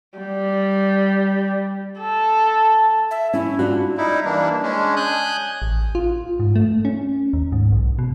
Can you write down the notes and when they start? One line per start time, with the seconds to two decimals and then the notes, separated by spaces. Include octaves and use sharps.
0.19 G3
2.01 A4
3.11 E5
3.33 C#4 E4
3.59 D4 F4 F#4
3.98 G3 D#4 E4
4.25 E3 G3 A#3 D4
4.63 G#3 C#4 D4
4.96 G#5 D#6 F#6 G6
5.62 A1
5.95 F4
6.40 G#2
6.56 A3
6.85 C#4
7.33 D#2
7.52 G#2
7.72 B1
7.99 B2